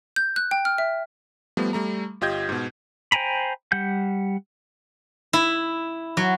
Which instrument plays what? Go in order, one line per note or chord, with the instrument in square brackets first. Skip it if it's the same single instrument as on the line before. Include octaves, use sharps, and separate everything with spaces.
[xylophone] G6
F#6
G5
F6
E5
[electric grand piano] F3 G3 A3 B3
G3 A3 A#5
G1 F4 G4 D#5 G6 G#6
G#2 B2
[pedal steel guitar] C5 G5 G#5 A#5 B5
G3 F#5 G6
[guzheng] E4
F#3